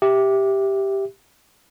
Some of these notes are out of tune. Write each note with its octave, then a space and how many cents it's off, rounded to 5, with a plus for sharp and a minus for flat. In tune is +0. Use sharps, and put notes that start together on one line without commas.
G4 +0 E5 +0